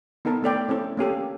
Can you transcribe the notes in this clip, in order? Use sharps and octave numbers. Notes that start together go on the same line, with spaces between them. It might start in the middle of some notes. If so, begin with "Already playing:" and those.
B3 D#4 A4 A#4 A5
A3 A4 D5 G5
C4 C#4 E4 A4
A#3 C#4 G4 A4